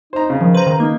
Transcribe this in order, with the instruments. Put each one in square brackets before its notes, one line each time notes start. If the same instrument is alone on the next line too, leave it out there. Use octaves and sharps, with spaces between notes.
[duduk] D#4 [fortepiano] C5 A#5
[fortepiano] C#3
[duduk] D#3 [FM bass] F3
[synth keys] B4 A#5 [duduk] C5
[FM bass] D#3
[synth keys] A#3 [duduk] D#4